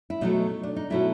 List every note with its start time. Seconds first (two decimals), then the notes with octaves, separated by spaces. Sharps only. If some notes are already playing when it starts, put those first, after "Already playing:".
0.10 E4
0.21 B2 F#3 A3 D#4
0.63 D4
0.76 D#4
0.90 B2 F#3 A3 E4